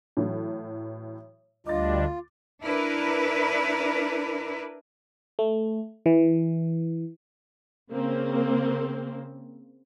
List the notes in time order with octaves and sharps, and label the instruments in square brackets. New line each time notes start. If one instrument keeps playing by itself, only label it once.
[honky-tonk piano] A2 E3 F#3
[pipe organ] D2 G3 D4 [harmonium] F4 [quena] D#5 [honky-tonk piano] D6 A6
[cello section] D4 E4 A#4 B4
[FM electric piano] A3
E3
[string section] C#3 A#3 C4